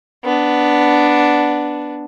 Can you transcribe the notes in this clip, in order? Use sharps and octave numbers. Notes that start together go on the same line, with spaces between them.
B3 D4